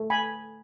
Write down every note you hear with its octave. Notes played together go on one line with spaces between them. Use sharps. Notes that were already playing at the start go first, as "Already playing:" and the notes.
Already playing: A3
G#5 B5